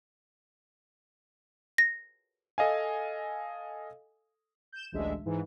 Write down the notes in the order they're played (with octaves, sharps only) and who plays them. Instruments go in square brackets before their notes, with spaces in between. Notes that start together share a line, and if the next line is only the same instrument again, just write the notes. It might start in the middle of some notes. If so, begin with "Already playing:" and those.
[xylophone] A#6
[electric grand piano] A4 D#5 F5 G#5
[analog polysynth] G6 E7
A1 D2 G#3 D4 E5
G#2 E3